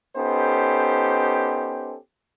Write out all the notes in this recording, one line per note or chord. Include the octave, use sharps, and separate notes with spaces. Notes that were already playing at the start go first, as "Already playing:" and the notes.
B3 C#4 D#4 G4 A4 C5